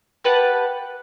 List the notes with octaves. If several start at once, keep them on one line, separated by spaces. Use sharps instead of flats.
G4 B4 F#5 A5